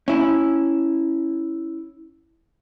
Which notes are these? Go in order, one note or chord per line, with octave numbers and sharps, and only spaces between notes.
C#4 E4